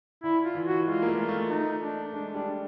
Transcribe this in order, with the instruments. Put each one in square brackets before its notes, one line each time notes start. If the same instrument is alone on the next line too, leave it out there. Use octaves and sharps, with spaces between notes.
[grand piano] D3 [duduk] E4
[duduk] F4
[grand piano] E3
[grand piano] E3 [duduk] F#4
[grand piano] G#3 [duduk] F4
[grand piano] A#3
A3
[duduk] F4
[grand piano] A3
[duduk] D#4
D4
[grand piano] G#3 [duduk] D4
[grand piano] G3 [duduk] D4